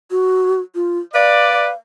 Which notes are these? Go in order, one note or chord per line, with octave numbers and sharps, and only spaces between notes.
F#4
F4
B4 D5 F5